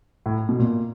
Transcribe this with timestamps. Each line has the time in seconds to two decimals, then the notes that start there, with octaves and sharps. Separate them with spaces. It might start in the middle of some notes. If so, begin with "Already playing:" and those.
0.26 A2
0.49 B2
0.59 A#2